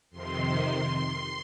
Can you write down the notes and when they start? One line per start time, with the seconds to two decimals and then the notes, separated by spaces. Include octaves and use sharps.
0.10 F2 C3 D#3 C6
0.95 C6